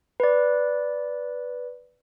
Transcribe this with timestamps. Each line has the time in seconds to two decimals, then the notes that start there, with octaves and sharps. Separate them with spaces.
0.20 B4 D5